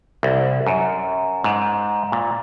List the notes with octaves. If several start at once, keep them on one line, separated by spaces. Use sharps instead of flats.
C2
F#2
G#2
A#2